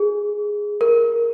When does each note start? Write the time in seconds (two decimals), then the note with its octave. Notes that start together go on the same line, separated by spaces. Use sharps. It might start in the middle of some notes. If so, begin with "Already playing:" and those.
Already playing: G#4
0.81 A#4